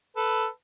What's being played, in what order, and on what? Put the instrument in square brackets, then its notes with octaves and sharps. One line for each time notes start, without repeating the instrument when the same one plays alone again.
[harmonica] A4 B4